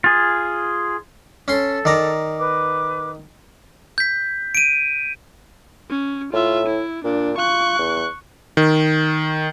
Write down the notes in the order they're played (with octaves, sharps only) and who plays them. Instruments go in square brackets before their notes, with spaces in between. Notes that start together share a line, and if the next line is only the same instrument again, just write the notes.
[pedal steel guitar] F4 G#4
[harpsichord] C#4 C6 [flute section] A4
[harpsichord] D#3 D5 A#5
[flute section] B4 D6
[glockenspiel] G6 B6
D7 D#7
[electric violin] C#4
[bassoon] A2 [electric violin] F4 E5
[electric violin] E4
[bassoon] A#2 [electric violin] D4
[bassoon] F4 [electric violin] C#6 F#6
[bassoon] E2
[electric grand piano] D#3